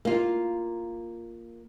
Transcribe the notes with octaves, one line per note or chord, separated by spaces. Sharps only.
A#3 F4